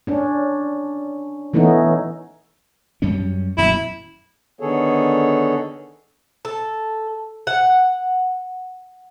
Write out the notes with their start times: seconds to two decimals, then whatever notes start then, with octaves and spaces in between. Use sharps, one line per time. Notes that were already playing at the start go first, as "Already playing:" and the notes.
0.07 C#4 D4
1.53 E3 A3 B3 C#4 D#4
3.02 F#2 G3 C#4
3.58 D#1 F#2 B2 E4
4.60 D3 D#3 B3 G#4 A4 C#5
6.45 A4
7.47 F#5